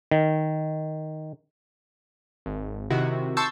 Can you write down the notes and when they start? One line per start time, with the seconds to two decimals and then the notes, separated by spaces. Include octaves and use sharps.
0.11 D#3
2.46 G#1
2.90 C3 D#3 E4 F#4
3.37 A5 C6 C#6 E6 G6 A6